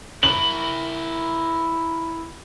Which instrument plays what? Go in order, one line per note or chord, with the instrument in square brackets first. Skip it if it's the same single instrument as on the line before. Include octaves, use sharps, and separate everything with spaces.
[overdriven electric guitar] E4 A#4 [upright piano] F#7